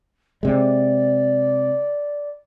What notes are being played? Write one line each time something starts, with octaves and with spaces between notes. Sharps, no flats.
C3 G#3 D5